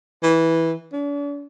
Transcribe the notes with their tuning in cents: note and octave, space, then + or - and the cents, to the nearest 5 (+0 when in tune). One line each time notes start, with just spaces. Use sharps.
E3 -10
D4 -45